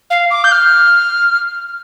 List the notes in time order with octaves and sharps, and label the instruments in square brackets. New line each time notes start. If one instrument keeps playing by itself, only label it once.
[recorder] F5
D6
G6
F6